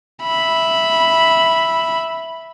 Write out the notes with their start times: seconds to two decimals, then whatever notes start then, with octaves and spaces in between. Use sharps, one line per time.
0.23 E5 B5